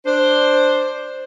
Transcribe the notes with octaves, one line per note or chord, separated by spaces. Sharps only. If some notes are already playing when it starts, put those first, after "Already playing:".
D4 C5